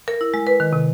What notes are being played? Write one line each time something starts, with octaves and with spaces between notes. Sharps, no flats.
A#4
E4
G#3
B4
D#3
C3